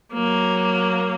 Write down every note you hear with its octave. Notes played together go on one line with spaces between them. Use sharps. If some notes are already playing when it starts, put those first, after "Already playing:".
F#3 A#3